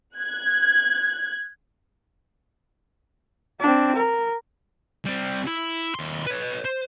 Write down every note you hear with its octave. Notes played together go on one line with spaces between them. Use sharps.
F#6 G#6
C4 D4
A#4
G3 C4
E4
D#2 C6
B4 C#5
C5